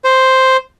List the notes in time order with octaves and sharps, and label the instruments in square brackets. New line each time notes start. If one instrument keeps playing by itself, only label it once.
[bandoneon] C5